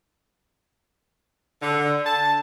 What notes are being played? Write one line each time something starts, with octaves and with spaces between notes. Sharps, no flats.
D3
A5